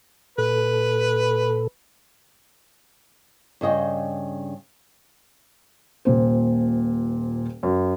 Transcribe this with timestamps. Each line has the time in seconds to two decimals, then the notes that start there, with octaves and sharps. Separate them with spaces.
0.38 A#2 A4 B4
3.61 G2 C#3 D#5 G5
6.05 D#1 A#2 C5
7.63 F#2